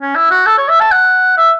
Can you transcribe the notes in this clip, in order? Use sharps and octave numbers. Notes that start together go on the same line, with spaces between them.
C#4
E4
F#4
A4
C#5
E5
A5
F#5
E5